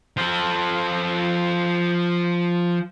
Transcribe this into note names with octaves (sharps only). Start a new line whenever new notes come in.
F3 A4